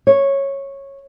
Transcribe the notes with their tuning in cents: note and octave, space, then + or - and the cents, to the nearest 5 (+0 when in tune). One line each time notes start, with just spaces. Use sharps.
C#5 -10